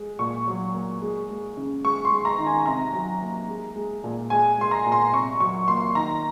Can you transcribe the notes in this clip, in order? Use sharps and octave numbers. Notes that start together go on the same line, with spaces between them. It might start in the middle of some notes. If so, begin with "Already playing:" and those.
Already playing: G#3
A#2 C#6
F#3
A#3
G#3
G#3
C#3
G#3 C#6
C6
G#3
A#5
D#3
G#5
C3 A#5
F#3
A#3
G#3
G#3
A#2
G#3 G#5
G#3 C6
A#5
A#2
C6
C3 C#6
F#3 C#6
A#3 C6
D#3 A#5